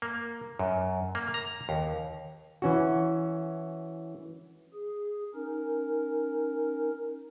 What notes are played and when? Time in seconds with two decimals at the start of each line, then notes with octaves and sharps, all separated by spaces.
0.02 A#3
0.59 F#2
1.15 A#3
1.34 A#5
1.69 D#2
2.62 E3 C#4 F#4
4.73 G#4
5.35 C#4 D#4 A#4